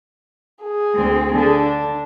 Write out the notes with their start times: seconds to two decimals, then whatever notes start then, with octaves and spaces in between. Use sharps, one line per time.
0.64 G#4
0.95 D2 C4
1.33 D3 G#4 A4
1.63 D4